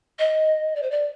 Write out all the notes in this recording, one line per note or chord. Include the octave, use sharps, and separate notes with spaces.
D#5
D5
C5
D5